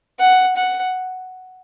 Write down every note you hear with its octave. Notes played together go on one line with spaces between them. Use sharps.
F#5
F#5